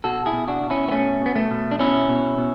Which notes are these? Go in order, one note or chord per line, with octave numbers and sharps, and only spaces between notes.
B2 F#4 A4
E4 G#4
B2
D4 F#4
B2
C#4 E4
B3
B2 A3 C#4
B2 B3
A3
B2
D4
B2 C#4 E4
B2
B2